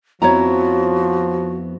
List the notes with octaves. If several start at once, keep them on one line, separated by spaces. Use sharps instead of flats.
F2 F3 B3 E4 F#4 C#5 A#5